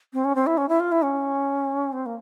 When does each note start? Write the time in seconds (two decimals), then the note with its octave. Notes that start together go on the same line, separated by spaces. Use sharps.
0.13 C4
0.25 C#4
0.35 C4
0.46 E4
0.57 C#4
0.69 E4
0.80 F4
0.92 E4
1.03 C#4
1.93 C4
2.06 A#3